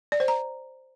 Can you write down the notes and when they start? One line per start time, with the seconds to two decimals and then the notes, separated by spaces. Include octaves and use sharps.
0.12 D5
0.20 C5
0.28 A#5